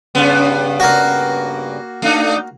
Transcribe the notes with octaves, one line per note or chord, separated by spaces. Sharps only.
G2 C#3 B3
A#3 F#4
A3 D4 D#4